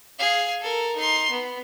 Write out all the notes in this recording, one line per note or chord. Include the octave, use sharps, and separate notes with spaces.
G#4 F5
A4 A#4
D#4 C6
B3